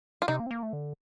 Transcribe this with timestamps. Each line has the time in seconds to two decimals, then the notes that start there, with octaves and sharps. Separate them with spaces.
0.22 F4
0.28 C3 D#4
0.40 A#3
0.46 C4
0.51 A#3
0.63 A3
0.73 D3